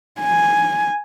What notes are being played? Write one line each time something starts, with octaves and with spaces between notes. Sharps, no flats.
G#5